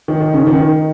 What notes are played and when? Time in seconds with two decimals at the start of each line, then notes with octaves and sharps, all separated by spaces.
0.08 D#3
0.20 D#3
0.34 C#3
0.47 D#3
0.60 D#3